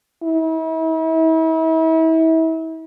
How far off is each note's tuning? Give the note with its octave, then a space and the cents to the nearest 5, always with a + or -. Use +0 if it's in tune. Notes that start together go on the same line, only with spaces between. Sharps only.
E4 -40